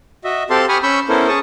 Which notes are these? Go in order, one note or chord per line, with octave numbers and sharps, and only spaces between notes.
F#4 D#5 E5
C4 G4 A4 F5 A5 C6
G4 G#5 B5 C#6 D#6 F6
C#4 B5 C#6 E6 G6
B3 C#4 E4 A4 A#4 C5
C#4 G#4 A5 C#6 D#6